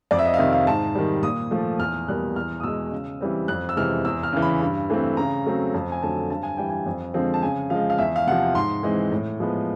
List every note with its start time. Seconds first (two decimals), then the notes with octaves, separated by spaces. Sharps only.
0.11 F2 D5
0.19 E5
0.25 D#5
0.34 F5
0.38 C3 D#3 E5
0.53 F5
0.66 G#2 A5
0.95 D#3 G3
1.23 A#2 D#6
1.51 F3 A3
1.79 E2 F6
2.08 B2 G3 A#3 F#6
2.36 E2 F6
2.60 D#6
2.63 B2 G#3 E6
2.92 C#3
3.21 E3 G3 C4
3.48 F2 F#6
3.69 E6
3.76 C3 E3 G#3 F6
4.05 E2 E6
4.23 F6
4.33 C#3 E3
4.42 B5
4.61 G2
4.90 E3 A3 C4
5.17 C#3 A#5
5.46 F#3 A3 C4
5.74 F2 A5
5.92 G#5
6.02 D3 F#3 A3 A5
6.30 G2 A5
6.43 G#5
6.57 E3 G3 G5
6.70 G#5
6.86 F2
7.14 D3 F3 G#3 C4
7.34 A5
7.42 C#3 G#5
7.70 F3 G#3 F5
7.90 F5
7.98 E2 E5
8.16 F5
8.27 C3 F#5
8.32 F3
8.55 G#2 C6
8.83 E3 G#3 C4
9.12 A2
9.40 F3 G#3 B3